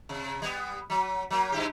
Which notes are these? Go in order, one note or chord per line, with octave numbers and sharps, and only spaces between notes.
C3
G3 B3
F#3
F#3 A#3
G2 E4 G4